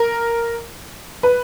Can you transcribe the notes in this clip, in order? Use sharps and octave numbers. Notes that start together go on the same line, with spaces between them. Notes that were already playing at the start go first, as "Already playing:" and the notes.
Already playing: A#4
B4